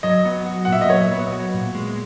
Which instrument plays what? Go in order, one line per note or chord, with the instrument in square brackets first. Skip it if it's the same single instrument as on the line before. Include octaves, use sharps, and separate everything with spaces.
[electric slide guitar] F#3 [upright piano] D#5
[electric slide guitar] B3
F#4
[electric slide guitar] A#2 [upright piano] F#5
[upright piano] E5
D#5
[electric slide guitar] F#3 [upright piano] C#5
[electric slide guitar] B3
F#4
A#2
G#3